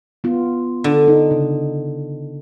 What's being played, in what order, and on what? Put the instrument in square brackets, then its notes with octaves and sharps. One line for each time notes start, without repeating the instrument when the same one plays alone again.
[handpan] B3 F4
[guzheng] D3
[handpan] D#4
C#3